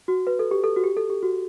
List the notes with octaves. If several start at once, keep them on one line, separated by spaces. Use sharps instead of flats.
F#4
B4
A4
G4
A4
F#4
G4
A4
G4
F#4